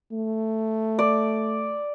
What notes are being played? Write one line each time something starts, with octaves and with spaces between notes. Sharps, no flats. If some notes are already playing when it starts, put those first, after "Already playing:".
A3
D5